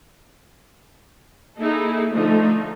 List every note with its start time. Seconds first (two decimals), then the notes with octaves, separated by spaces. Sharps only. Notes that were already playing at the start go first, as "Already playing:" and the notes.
1.59 A#3 D#4 E4 G#4 A4
2.11 D3 F3 A3 D#4